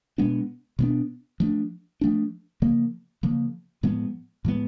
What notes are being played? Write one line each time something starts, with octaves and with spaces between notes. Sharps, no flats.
B2 G#3 B3 D4
B2 G#3 B3 D4
F3 A3 D4
F3 A3 D4
C#3 F3 A#3
C#3 F3 A#3
A2 F3 G#3 B3
A2 F3 G#3 B3